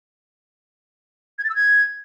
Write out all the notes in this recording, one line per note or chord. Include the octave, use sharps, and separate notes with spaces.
G#6
A6
E6
G#6